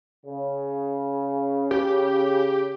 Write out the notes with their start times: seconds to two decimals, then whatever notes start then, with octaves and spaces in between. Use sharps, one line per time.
0.25 C#3
1.71 G4